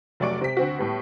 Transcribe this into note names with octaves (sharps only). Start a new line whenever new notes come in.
F1 F#3 A3 D5 C#6 D7
C3 B6
D2 C4 F#4
A2 G3 B3